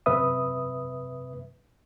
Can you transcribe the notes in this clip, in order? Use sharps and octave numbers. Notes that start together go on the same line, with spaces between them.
F#2 C3 B4 E5 D#6